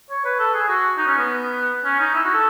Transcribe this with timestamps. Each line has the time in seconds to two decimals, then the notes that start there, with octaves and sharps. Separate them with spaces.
0.10 C#5
0.25 B4
0.39 A4
0.54 G#4
0.68 F#4
0.98 D#4
1.07 C#4
1.18 B3
1.85 C#4
1.99 D#4
2.14 E4
2.24 F#4
2.34 A4